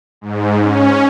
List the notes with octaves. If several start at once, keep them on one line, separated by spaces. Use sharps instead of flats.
G#2
C#4